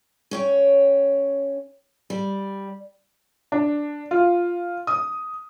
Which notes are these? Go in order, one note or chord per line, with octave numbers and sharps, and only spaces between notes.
C#4 C#5 G5
G3
D4
F4
D#6